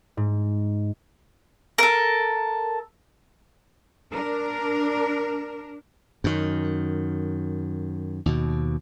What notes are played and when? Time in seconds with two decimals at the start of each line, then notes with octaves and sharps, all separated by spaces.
0.17 G#2
1.78 A4 A#4
4.12 D4 A#4
6.24 F#2 D#3
8.26 D#2 B2